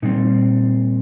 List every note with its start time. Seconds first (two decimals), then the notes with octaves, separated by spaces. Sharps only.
0.02 A#2 G3 C4 D#4